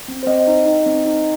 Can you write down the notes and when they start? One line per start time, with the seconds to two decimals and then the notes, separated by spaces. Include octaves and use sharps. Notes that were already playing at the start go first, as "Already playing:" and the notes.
0.08 C4
0.23 C5
0.27 C4 D#5
0.47 D#4
0.66 D#4
0.86 C4
1.05 D#4